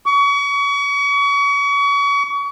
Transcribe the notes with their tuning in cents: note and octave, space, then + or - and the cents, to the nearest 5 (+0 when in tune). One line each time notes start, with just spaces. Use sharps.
C#6 +35